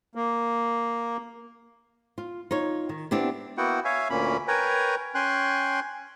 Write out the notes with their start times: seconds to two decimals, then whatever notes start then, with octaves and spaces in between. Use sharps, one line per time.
0.15 A#3
2.18 F4
2.51 D#4 F4 C#5
2.89 D#3
3.11 B3 C4 D4 E4 G4
3.57 A#3 B3 E4 F#4 F#5 G5
3.85 C#5 E5 F5 G#5
4.10 D2 A#2 A#3 C#4 B5
4.48 A#4 B4 C#5 G5 G#5 A#5
5.15 C#4 G5 G#5 C6 F#6